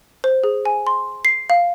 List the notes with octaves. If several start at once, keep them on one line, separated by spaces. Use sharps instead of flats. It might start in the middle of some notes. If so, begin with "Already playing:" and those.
C5
G#4
G#5
C6
C7
F5